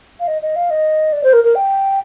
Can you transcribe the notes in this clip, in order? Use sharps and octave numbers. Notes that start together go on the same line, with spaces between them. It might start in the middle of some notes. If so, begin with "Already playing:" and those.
F5
D#5
D#5
F5
D#5
D5
C5
A#4
A#4
G5